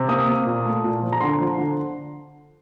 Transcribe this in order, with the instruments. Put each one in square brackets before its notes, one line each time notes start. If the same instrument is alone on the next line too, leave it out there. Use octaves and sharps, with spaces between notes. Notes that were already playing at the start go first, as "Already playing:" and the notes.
Already playing: [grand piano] C3
A#3 D#6
A#3
A#2
A3
A#2
F3
A#5
D3 C6
F3
D3